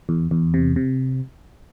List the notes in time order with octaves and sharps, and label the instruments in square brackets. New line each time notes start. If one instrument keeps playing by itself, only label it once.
[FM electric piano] E2
E2
C3
C3